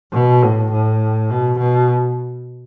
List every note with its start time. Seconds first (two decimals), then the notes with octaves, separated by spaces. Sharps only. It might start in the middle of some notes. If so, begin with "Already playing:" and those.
0.13 B2
0.42 A2
0.72 A2
1.29 B2
1.58 B2